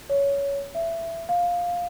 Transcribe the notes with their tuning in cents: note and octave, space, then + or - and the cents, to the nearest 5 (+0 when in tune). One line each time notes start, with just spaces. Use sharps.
C#5 +15
E5 +15
F5 +10